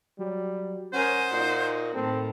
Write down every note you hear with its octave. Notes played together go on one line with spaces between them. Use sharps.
F#3 G3
C#4 A#4 C5 F#5 G#5 D#6
A#2 D#4 F#4
A2 D#3 C4 A4